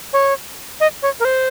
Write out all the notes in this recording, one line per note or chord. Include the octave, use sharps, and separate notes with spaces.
C#5
D#5
C#5
A#4
C5